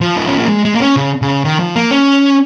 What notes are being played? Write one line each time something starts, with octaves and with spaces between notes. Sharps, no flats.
F3
D#4
C#4
A#3
G#3
G#3
A#3
C#4
C#3
C#3
D#3
F3
A#3
C#4